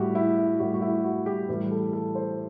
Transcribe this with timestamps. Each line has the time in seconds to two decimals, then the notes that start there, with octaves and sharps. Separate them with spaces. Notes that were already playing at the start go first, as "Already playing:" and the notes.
Already playing: A2 G3 F#4 G4
0.15 E4
0.37 E4
0.60 A2 G3 F#4
0.74 F#4
0.82 E4
1.04 F#4
1.26 G4
1.49 A2 E3 G3 B4
1.71 A4
1.93 A4
2.15 C5